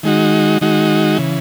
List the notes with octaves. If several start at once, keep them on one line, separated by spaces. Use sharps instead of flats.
D#3 G#3 D#4 F#4
D#3 G#3 D#4 F#4
C#3 E3